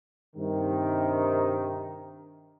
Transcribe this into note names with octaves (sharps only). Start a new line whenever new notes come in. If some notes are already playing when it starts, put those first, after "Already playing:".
G2 C3 D#3